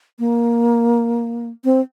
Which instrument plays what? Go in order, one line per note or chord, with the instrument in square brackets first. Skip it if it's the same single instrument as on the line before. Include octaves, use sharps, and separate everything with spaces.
[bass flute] A#3
C4